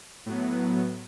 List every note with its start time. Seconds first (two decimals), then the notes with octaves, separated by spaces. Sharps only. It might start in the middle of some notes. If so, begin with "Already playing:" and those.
0.26 A2 F#3 B3